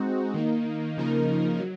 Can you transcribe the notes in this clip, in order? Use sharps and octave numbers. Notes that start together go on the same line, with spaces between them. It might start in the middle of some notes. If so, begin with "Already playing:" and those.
Already playing: G#3 C4 D#4 F#4
D#3 A#3 D#4
C#3 F3 A#3 D#4 A#4
F#3